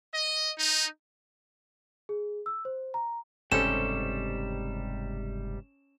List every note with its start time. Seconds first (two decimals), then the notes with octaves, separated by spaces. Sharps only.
0.15 D#5
0.59 D#4
2.09 G#4
2.46 E6
2.65 C5
2.94 A#5
3.52 F#1 G#2 C3 G3 C#4 A4 C5 E7